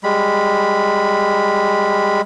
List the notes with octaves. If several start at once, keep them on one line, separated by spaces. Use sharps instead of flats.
G3 G#3 B5